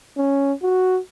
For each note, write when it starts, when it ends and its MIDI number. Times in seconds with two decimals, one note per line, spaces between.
0.17 0.53 61
0.62 0.99 66